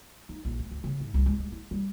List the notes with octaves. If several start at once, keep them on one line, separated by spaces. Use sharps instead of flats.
D#4
A#1
A3
D2
C#3
G#2
C2
G#3
G#3
E4
G3